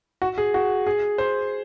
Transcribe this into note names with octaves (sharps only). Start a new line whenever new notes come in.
F#4
G#4
F#4
G#4
C5